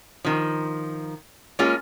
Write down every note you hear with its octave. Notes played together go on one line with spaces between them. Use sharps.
D#3 F3
G#3 A#3 C#4 F4 G#4